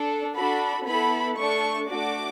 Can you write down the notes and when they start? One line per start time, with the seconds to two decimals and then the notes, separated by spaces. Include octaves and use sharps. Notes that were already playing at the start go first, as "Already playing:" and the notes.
Already playing: D4 A4
0.36 D4 F#4 A4 B5
0.87 B3 E4 A4 B5
1.38 A3 D4 A4 C#6
1.90 A3 D4 F#4 D6